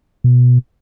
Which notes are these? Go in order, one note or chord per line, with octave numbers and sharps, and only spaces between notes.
B2